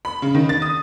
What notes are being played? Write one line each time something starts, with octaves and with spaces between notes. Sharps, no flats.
B5
C#3
D#3
A6
D#6